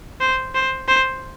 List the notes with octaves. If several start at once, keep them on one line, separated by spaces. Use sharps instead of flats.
C5
C5
C5